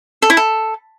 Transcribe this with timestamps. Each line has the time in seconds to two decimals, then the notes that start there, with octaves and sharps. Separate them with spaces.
0.22 A4
0.30 E4
0.37 A4